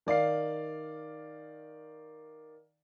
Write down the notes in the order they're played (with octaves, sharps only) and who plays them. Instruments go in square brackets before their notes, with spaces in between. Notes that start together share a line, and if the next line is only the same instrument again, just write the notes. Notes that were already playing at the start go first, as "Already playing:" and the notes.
[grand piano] D#3 D5 F5 C7